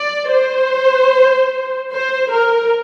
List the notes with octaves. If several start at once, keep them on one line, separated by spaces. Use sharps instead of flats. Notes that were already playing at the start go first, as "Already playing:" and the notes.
Already playing: D5
C5
C5
A#4